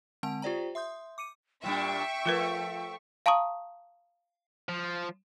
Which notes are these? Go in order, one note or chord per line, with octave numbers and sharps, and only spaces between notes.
D3 G#3 C4 F#5 A5 D7
F4 G4 C5 D5 G5 A#5
E5 C6 D#6 G6
D6 C#7 D#7
A#2 G3 D4 E5 G5 C#6
F3 A3 F4 A#4 B4
F5 A5 A#5 C#6 D#6
F3